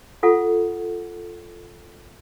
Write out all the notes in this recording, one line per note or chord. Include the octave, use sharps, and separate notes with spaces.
F4 A4 F#5